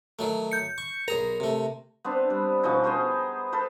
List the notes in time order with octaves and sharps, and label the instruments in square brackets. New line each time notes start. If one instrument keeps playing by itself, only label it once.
[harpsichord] D#3 F#3 A3
[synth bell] G6 C#7
[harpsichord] C#6
[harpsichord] B1 G#4 A#5 [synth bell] A#4
[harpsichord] C3 A3
[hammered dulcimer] B3 C4 D4 C5
G3
B2 F3 C#4 D#4
B3 G#4 C5 G5
A4 B4 C5